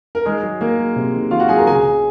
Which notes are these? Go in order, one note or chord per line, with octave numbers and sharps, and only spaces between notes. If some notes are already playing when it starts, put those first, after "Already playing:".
A#4
D#3 G#3 G#4
F#3
D#3 A#3 A#4
F#3
C3
D#3
D#3 F4 F5
F#4 F#5
F#3 G#4 G#5
A#4 A#5
C#2 G#4 G#5
C#3